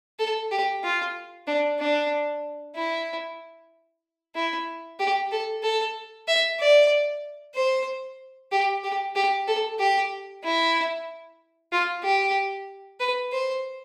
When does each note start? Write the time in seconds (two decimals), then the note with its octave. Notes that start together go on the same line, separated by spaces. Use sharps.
0.19 A4
0.52 G4
0.84 F4
1.47 D4
1.80 D4
2.76 E4
4.35 E4
5.00 G4
5.32 A4
5.63 A4
6.28 E5
6.60 D5
7.55 C5
8.52 G4
8.84 G4
9.16 G4
9.48 A4
9.80 G4
10.44 E4
11.72 F4
12.04 G4
13.00 B4
13.32 C5